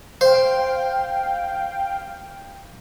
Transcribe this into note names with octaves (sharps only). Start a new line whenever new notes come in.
C5 F5 G5